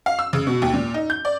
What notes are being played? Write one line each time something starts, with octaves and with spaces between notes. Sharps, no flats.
F5
E6
C#3
B2
D#2
A#2
D#4
G6
D5